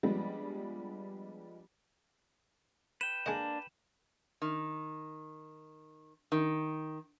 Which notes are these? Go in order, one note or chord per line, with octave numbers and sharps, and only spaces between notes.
F3 G3 G#3 B3 D4
B4 G5 E7
G#3 A#3 D4 D#5
D#3
D#3